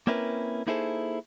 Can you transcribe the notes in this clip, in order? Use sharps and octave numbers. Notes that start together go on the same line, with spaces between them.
A#3 C4 C#4 E4 A#4 B4
A#3 D#4 E4 G#4 A4 C5